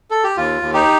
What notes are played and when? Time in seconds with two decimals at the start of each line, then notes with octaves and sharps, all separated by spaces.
0.11 A4
0.24 G4
0.37 D#2 F4
0.62 D#2
0.74 D#4 G4